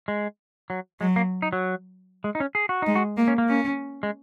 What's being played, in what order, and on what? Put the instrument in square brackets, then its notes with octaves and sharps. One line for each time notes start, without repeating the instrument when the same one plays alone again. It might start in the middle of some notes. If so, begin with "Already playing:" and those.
[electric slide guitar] G#3
F#3
[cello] F#3 [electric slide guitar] G#3
[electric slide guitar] A#3
D#4
F#3
G#3
D#4
C#4
G#4
F#4
[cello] G#3 [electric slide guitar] D#4
[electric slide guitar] F#4
[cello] A#3
[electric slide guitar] C#4
A#3
[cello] C#4
[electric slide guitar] G#3